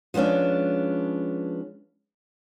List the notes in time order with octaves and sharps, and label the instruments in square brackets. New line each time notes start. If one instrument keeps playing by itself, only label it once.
[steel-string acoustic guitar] F3 G#3 B3 C#4 D4